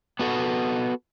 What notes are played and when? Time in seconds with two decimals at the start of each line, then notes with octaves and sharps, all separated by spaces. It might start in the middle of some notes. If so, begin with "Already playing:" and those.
0.19 B3 F#4 A4